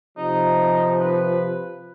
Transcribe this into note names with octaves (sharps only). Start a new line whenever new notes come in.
C3 F3 D#4
B4